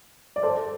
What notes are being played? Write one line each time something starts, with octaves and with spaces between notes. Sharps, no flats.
D5
A4 C5